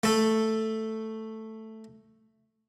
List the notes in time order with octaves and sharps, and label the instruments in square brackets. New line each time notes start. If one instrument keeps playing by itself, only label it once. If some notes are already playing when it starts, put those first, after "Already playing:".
[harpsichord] A3 A4